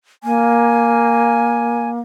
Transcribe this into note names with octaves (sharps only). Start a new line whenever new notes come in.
A#3 G#5